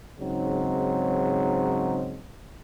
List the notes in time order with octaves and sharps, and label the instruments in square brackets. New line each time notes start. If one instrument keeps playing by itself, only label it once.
[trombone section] G#2 C#3 F#3 C4 D#4